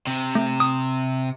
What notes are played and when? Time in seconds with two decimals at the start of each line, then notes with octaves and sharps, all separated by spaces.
0.07 C3
0.35 A3
0.60 D#6